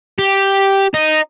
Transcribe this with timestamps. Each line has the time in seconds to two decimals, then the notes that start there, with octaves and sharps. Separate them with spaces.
0.19 G4
0.94 D#4